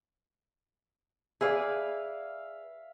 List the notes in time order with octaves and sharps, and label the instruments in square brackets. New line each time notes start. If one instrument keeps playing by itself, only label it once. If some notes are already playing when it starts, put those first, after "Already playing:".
[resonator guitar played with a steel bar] G#4 B4 D5 [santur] E5 F5